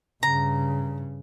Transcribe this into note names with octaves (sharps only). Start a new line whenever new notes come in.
G2 C#3 A#5